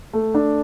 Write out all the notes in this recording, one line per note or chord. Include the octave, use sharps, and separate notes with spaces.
A3
D4